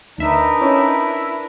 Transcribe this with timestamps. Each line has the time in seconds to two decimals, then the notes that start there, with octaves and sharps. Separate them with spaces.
0.18 D2 D4 D#4 A#4 B4 E5
0.62 C#4 E4